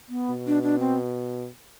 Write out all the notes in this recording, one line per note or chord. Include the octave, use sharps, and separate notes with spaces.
B3
B2
D4
D4
C4